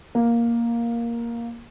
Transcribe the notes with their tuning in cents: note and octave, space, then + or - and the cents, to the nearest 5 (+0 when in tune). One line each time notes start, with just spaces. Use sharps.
A#3 +5